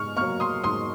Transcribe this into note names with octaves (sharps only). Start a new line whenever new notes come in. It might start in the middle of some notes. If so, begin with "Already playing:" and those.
Already playing: G#2 C#6 F6
F#3 A#3 C#6 F6
C6 D#6
G#2 C6 D#6